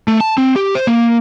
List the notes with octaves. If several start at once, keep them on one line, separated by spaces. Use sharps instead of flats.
A3
A5
C4
G4
C5
A#3